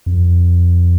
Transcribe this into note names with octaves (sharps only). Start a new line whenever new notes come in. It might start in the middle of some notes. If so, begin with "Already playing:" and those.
F2